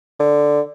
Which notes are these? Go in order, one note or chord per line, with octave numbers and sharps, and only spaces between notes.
D3